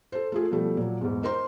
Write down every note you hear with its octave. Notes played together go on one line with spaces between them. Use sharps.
A4 C5
A3 F4 G#4
B2 F3 G3 A3
A#2 F#3
E2 G#2
D#4 A#4 C5 C6